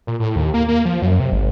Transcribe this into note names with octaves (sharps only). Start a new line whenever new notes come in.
A#2
A2
D#2
A#3
A#3
F3
F#2
C3
G#1